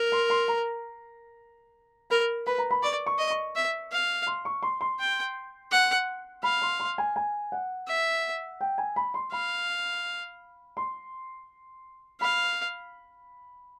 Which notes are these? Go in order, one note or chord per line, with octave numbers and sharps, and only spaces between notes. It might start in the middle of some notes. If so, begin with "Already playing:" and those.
Already playing: A#4
C6
C6
A#5
A#4 B5
B4 B5
A#5
B5
D5 C#6
C#6
D#5
C#6
E5
F5
C6
C#6
C6
C6
G5
F#5
F5 B5
C6
C6
G#5
G#5
F#5
E5
G5
G#5
B5
C6
F5 B5
C6
F5 B5